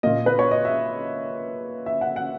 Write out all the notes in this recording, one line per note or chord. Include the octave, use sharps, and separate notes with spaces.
A#2 A#3 D#5
B4
C#5
D#5
E5
E5
F#5
F#5